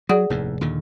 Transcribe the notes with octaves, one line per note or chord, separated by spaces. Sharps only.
F#3 G#4 D5 F#5
F1 D#2 A2
D#2 A#2 D3